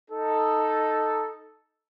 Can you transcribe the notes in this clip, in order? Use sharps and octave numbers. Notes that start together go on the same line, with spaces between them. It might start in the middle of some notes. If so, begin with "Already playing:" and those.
D#4 A4